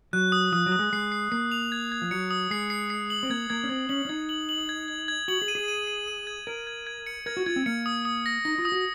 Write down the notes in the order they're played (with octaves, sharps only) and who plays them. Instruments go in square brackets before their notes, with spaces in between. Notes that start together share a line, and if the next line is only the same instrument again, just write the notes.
[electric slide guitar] F#3 [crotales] F#6
[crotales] D#6
[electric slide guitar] F3 [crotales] D#6
[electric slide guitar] F#3
[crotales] D#6
[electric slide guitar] G#3
[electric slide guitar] G#3 [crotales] C7
[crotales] C7
[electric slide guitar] A#3 [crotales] C7
[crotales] F7
G#6
G#6
[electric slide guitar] F3
[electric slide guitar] F#3 [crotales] C#7
[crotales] D#6
[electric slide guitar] G#3 [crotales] C7
[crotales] C7
C7
F#7
[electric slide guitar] C4
[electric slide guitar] A#3 [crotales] G#6
[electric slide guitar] A#3 [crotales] G#6
[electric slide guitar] C#4
[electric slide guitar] C4 [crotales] G#6
[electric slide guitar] C#4 [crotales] F#7
[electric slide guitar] C#4
[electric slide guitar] D#4 [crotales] G#6
[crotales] F#7
F#7
G#6
G#6
G#6
[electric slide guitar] F#4 [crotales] F#7
[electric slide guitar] G#4
[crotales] D#7
[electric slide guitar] G#4
[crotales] D#7
D#7
D#7
G#6
[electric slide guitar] A#4 [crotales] G#6
[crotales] G#6
G#6
C#7
[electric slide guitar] A#4 [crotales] G#6
[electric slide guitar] F#4
[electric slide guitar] F4 [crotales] G#6
[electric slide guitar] C4
[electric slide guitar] A#3 [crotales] C#7
[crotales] D#6
D#6
A#6
[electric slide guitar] D#4 [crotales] A#6
[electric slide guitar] F4
[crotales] D#6
[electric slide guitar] F#4